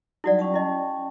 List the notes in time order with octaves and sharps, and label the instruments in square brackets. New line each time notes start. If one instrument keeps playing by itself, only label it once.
[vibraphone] F#3 G3 D#4 [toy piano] E4 F#4 D5
[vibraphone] C#4 G5 A5
[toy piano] E4 D#5